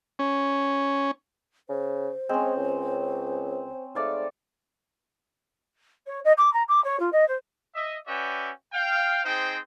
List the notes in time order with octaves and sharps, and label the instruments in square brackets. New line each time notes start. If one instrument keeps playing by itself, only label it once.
[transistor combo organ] C#4
[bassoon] C#3 [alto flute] C5
[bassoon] G#3 [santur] C4 C#4
[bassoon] C#2
[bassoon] G#2 [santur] A3 D5 F5
[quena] C#5
D#5
D6
A#5
D6
C#5
F4
D#5
C5
[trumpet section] D#5 E5
C#4 F#4 B4 D5 E5 G5
F5 G5
C4 D#4 G#4 C5 G5